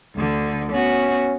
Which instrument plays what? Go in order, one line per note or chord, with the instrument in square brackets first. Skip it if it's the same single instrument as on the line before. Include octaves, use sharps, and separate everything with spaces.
[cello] D2 D3
[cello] B3 F#4 [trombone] C#4